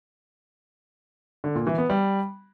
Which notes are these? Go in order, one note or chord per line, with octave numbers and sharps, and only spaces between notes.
D3
A#2
E3
B3
G3